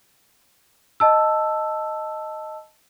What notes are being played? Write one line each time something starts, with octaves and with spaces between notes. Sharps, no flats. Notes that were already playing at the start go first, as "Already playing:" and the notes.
D#5 A5 E6